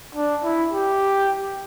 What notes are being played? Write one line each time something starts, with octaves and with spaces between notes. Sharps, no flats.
D4
E4
G4